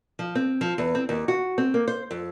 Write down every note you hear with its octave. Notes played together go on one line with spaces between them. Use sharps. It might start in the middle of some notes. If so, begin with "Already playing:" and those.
F3
C4
F3
E2
C4
D#2
F#4
C4
A#3
C5
F2